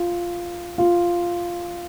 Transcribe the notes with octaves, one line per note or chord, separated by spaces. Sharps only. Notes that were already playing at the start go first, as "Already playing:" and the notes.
Already playing: F4
F4